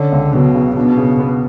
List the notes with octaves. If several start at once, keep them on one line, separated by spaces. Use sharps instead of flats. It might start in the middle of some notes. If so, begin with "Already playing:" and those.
Already playing: D3 C#4
C#2
B2 F#3
C#3
B2 D4
C#3
B3